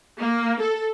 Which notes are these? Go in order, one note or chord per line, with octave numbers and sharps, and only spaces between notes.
A#3
A4